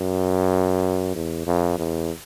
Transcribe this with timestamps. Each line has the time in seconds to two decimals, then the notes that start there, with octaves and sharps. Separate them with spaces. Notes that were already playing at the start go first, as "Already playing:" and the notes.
Already playing: F#2
1.15 E2
1.47 F2
1.78 E2